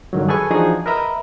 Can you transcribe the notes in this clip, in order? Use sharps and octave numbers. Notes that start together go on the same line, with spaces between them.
G2 D3 D#3 F#3
G#4 A4 B4 G#5 C#6
E3 F3 D4 D#4 F#4 G#4
A#4 B4 D#5 E5 A#5 B5